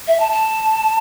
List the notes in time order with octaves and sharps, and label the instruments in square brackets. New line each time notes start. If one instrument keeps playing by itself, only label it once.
[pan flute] E5
A5
A5